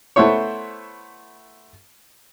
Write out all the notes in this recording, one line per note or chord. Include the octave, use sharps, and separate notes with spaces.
A3 B3 E4 C5 C#5